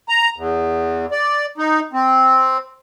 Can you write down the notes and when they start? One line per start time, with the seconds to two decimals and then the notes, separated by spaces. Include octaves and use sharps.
0.09 A#5
0.37 E2
1.11 D5
1.58 D#4
1.93 C4